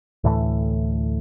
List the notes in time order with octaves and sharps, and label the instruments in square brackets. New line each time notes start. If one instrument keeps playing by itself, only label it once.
[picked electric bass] D2 A2 E3 A3